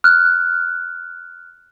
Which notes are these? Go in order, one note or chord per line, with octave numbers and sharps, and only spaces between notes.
F6 F#6